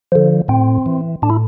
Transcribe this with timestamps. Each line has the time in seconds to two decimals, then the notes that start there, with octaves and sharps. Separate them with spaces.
0.12 D3 F3
0.48 A2 C4
0.86 E3
1.22 A2 D4
1.30 E4